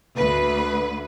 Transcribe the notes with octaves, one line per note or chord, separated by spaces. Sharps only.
D2 B4